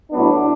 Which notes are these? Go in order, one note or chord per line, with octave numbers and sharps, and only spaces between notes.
A2 F#3 B3 D4